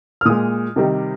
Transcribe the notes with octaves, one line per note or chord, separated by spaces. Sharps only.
F6
A#2 G#3 D#6
C3 D#3 G3